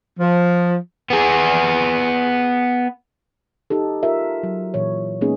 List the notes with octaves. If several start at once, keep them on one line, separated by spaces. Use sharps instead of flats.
F3
B3 G#4
D#4 G4 A4
F4 G4 A#4 E5
F#3
A#2 E3 C#5
G#3 A#3 B3 C#4 D#4 G#4